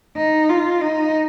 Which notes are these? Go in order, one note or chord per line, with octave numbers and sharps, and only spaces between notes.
D#4
F4
D#4